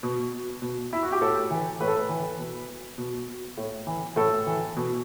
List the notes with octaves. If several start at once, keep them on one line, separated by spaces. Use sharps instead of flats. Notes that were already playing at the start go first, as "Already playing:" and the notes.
B2
B2
E4
F#4
G4
A2 A4
E3
A2 B4
A4
B4
E3
B2
B2
A2
E3
A2 A4
E3
B2